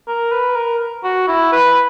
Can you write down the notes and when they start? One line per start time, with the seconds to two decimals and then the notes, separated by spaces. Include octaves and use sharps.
0.07 A#4
0.32 B4
0.56 A#4
1.04 F#4
1.28 E4
1.52 B4